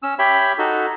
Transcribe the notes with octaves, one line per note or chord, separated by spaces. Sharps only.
C#4 E6
G4 C#5 E5 G5 B5
D#4 F#4 A4